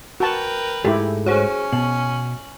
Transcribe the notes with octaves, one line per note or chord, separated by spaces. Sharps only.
F#4 A#4 B4 G5 A5
G#2 G#3 A3 E4 G4
C#4 F#4 G#4 C5 C#5
B2 F#7